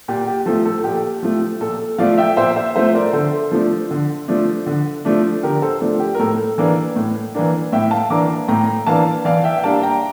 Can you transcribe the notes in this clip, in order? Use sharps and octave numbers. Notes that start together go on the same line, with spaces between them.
A#2 G4
G4
F3 A3 A4
A4
A#2 G4
F3 A3
A#2 A4
F3 A3 D5 F5
E5 G5
A#2 C5 E5
C5 E5
F3 A3 C5 E5
A#4 D5
D3 A4 C5
F3 A3 D4
D3
F3 A3 D4
D3
F3 A3 D4
D3 G4 A#4
A4 C5
F3 A3 D4
G4
A#4
A2 A4
E3 A#3 D4
A2
E3 A#3 D4
A2 E5 G5
F5 A5
E3 A#3 D4 A#5 D6
A2 G5 A#5
E3 A#3 D4 F5 A5
E3 D5 F5
E5 G5
G5
G3 A#3 D4 F5 A5
G5 A#5